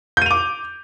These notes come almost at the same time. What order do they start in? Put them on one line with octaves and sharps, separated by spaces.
G6 D#7 F7 D6